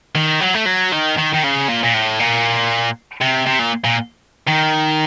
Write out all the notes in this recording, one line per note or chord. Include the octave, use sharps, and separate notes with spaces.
D#3
F#3
A3
F#3
D#3
D#3
D#3
C#3
A#2
A#2
A2
A#2
C3
C3
A#2
A#2
D#3